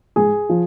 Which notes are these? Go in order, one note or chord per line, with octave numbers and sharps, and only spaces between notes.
G#2 G#4
F3